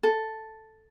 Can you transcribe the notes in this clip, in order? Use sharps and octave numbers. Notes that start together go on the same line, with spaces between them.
A4